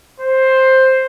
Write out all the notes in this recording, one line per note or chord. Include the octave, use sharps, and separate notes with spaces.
C5